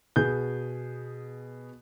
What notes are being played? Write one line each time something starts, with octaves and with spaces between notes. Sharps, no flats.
B2 G#4 G6